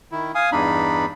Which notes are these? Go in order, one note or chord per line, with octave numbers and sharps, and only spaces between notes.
D#3 E4
F5 G#5 D#6
E2 G2 D4 D#4 B5